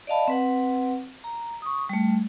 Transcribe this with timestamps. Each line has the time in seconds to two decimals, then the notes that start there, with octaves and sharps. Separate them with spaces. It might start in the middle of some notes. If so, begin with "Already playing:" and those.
0.07 D5 D#5 F5 A5 B5
0.28 C4 B4 F#5
1.24 A#5
1.62 C#6 D#6
1.89 G3 A3